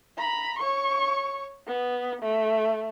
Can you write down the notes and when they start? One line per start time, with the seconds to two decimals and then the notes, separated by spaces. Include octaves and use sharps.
0.18 A#5 B5
0.59 C#5 C#6
1.67 B3
2.22 A3